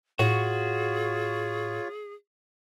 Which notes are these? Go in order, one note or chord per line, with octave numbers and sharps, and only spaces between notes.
A2 F4 F#4 G#4 C#5